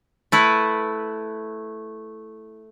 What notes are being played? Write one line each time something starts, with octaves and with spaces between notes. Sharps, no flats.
A3 E4 B4